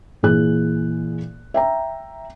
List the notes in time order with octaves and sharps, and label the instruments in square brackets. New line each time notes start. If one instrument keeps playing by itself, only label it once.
[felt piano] A#2 E3 G#4 F#6
E5 G5 A#5